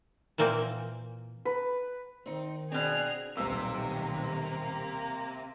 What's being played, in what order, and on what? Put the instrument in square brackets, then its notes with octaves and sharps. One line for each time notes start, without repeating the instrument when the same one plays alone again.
[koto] A#2 E3 A#3 C4
[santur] B4
[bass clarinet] D#3 [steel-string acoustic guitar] C4 D#4
[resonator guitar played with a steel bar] B2 C4 [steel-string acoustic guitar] D4 [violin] G#4 F7
[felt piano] D#1 E6 [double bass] B1 D#3 [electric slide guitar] C3 [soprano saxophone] A#3